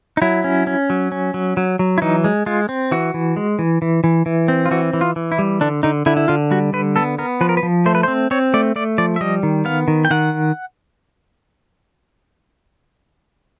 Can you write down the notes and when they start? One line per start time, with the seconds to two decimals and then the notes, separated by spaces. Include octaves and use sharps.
0.17 D#4
0.22 F#3 E4
0.44 C#4
0.67 C#4
0.90 F#3
1.12 C#4
1.34 F#3
1.57 F#3
1.79 F#3
1.98 E4
2.02 E3 D#4
2.24 G#3
2.46 G#3 F4
2.69 C4
2.92 E3 F#4
3.14 E3
3.36 G#3
3.59 E3
3.82 E3
4.04 E3
4.26 E3
4.48 C4
4.66 F4
4.71 E3 F#4
4.93 E3
5.01 F4
5.16 E3
5.32 E4
5.39 G3
5.61 D3 D4
5.83 D3 D#4
6.06 D3 E4
6.17 E4
6.28 D3 F4
6.51 G3 F#4
6.73 D3 B4
6.96 B3 A4
7.18 B3 A#4
7.41 F3 B4
7.49 A#4
7.57 B4
7.63 F3
7.86 A3 C5
7.95 B4
8.03 C5
8.08 C4
8.31 C4 C#5
8.54 A3 D5
8.76 A3 D5
8.98 F3 D5
9.16 E5
9.21 G3 D#5
9.43 D#3
9.65 B3 F5
9.88 D#3
10.05 G5
10.11 D#3 F#5